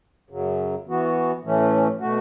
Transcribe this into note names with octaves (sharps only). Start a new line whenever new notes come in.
F#2 C#3 F#3
E3 B3 F#4
A2 E3 A3 C#4
B2 A3 F#4